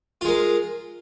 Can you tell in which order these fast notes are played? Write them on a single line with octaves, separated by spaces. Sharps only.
F4 G#3 A#4